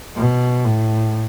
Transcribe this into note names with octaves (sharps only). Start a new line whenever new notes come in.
B2
A2